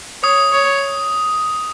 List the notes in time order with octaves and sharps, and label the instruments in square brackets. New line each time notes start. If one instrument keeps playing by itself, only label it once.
[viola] C#5 [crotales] D#6
[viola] C#5